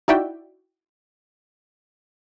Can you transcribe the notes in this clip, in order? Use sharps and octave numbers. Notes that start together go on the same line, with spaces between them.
D#4 E4 F#4 D5 E5 G5